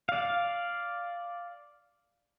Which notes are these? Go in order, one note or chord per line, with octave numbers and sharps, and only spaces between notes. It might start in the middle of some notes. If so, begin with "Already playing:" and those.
D5 F5